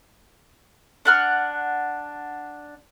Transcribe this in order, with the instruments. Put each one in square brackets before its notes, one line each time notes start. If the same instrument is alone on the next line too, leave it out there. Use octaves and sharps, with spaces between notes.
[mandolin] D4 F#5 F6